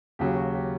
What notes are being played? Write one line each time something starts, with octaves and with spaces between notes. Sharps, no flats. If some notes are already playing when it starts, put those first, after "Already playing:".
D#2 C#3 F#3 G4
F#4
G4